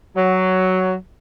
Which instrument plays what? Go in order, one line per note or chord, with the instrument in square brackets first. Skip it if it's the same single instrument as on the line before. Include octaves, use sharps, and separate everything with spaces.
[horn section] F#3